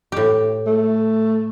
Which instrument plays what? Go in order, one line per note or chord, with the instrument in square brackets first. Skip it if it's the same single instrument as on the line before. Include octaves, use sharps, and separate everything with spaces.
[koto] A2 G4
[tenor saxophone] A3